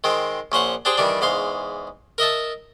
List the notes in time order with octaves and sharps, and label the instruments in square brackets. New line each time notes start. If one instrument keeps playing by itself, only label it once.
[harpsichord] D#3 G#3 C4
A#1 C#4 C5 F#5
D4 G4 G#4 C5 G5
D#3 E3 G3 D4
E2 G#2 F5 C6
A#4 D#5 E5 A5